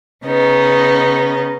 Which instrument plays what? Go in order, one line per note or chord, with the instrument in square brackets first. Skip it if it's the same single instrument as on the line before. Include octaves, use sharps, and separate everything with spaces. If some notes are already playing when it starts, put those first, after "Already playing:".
[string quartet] C#3 B3 D#4